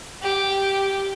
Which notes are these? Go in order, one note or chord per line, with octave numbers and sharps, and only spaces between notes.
G4